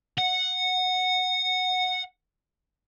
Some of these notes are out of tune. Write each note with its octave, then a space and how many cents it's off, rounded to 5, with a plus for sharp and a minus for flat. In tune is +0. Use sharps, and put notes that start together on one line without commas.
F#5 -10